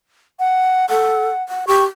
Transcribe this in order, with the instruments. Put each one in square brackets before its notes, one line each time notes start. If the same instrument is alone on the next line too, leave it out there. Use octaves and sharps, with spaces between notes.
[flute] F#5
[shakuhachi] A4 [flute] F#5
[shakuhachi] F#5
[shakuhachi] G4 [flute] C#6